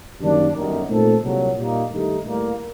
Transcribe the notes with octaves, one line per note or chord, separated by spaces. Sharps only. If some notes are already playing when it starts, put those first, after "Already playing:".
F#2 D#3 G3 A#3 D4
G1 F#2 D#3
A#2 A3 C4 D#4 A4
C2 A#2 F#3
A#2 G3 A#3 D#4
G2 D#3 A3 D#4 G4
A2 G3 A#3